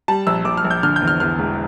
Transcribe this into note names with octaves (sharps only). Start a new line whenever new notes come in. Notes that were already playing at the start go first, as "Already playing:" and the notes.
G3 A5
A#1 E6
A#1 D6
F6
A#1
G6
D3 F6
G6
E2
F6
E2 F6
E1